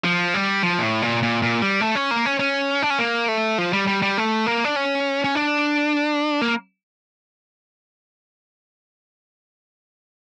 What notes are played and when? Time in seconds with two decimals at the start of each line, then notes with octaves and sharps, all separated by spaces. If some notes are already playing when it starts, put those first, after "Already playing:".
0.04 F3
0.34 G3
0.63 F3
0.78 A#2
0.83 A2
1.02 A#2
1.23 A#2
1.42 A#2
1.62 G3
1.81 A3
1.95 C#4
2.11 A#3
2.26 C#4
2.39 C#4
2.82 D4
2.90 C#4
2.99 A#3
3.28 A3
3.58 F3
3.73 G3
3.87 G3
4.02 G3
4.18 A3
4.46 A#3
4.64 D4
4.76 C#4
5.24 C#4
5.35 D4
6.42 A#3